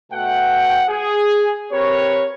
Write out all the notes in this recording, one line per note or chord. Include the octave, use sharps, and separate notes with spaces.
B2 A3 F#5 G5
G#4
C4 G4 A#4 B4 C#5